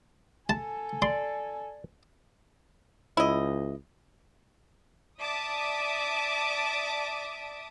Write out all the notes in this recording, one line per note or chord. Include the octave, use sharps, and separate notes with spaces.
A4 G#5 A5
D5 C6
C#2 E4 D#5
D5 E5 A5 D6 D#6